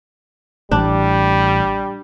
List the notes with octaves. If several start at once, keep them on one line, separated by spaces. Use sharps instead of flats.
A1 G3 D4